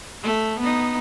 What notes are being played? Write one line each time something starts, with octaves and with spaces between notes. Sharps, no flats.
A3
B3 D#4